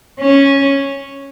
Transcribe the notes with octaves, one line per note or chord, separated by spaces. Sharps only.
C#4